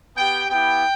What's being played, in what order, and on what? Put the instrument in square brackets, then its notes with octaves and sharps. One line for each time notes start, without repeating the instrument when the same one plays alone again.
[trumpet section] B3 G4 G5
B3 E4 G4 G5